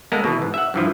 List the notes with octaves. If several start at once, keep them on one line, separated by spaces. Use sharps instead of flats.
G#3 A#3 B3 A4 A#4
B2 E3
G#2
E5 F#5
G2 E3 F3